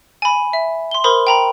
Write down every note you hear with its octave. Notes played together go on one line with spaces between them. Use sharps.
G#5 B5
E5
C6 G7
A#4 C5 B5 C6 D#6
G5 A#5 B5